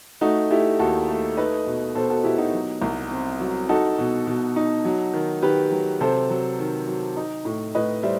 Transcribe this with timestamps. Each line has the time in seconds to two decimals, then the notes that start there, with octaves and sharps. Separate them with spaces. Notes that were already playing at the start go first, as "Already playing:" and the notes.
0.21 A3 D#4 F#4
0.50 A3 E4 G4
0.79 D#2 F#4 A4
1.09 A3
1.37 D#4 B4 D#5
1.66 B2
1.95 B2 A4 C5
2.09 F#4 A4
2.24 B2 E4 G4
2.38 D#4 F#4
2.53 F#3
2.82 C2
3.11 C4
3.40 F#3
3.69 D#4 F#4 A4
3.98 B2
4.27 B2
4.56 D#4
4.85 F#3
5.13 D#3
5.42 D#3 G4 B4
5.71 F#3
6.01 C3 A4 C5
6.30 F#3
6.59 D#3
6.87 F#3
7.17 D#4
7.45 A2
7.74 A2 B4 D#5
8.03 G3 C5 E5